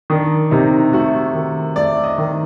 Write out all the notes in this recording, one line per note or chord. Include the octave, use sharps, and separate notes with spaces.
D#3 D4
C3 D#4
A3 F#4
D#3
A3 D5
D#5
D#3